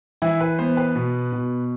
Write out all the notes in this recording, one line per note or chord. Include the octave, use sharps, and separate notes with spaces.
E3 E4
B4
B3 C5
B4
B2
B2